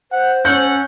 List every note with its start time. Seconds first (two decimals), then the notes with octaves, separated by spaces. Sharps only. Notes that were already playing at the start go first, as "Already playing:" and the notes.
0.12 C5 F#5
0.45 C#4 A4 F#5 G6